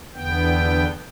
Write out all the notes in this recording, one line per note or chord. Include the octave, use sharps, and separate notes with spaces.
E2 D3 B3 G5